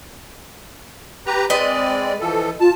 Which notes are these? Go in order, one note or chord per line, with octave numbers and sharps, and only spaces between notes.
G4 B4 A#5
G#3 C4 B4 D5 D#5
E3 F3 A4
F4 A5